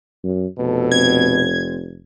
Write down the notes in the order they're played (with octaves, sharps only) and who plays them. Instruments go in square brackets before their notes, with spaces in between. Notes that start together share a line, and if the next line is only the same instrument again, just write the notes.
[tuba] F#2
[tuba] F1 [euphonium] B2 [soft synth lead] A4
[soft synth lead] C4 [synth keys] G#6